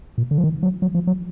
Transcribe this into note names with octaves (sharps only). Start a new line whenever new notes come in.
A#2
D3
F3
D#3
F#3
F#3
F3
F#3